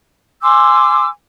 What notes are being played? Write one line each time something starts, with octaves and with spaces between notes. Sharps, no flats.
G#5 C6 D6 E6